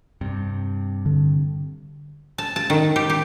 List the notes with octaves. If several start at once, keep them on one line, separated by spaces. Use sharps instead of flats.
G2 C3
D3
A5
A5
D#3
G4
G4